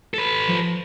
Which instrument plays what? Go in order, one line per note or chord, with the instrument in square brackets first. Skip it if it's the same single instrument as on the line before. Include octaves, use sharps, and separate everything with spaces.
[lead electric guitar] A4 B4
[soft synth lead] F3